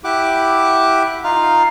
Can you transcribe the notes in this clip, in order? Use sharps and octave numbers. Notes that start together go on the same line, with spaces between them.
E4 G4 F#5 D6
D#4 F4 F5